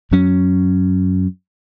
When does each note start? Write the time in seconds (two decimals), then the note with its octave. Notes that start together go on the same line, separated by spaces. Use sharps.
0.11 F#2 F#3 C#4